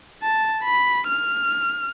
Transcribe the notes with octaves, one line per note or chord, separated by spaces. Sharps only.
A5
B5
F6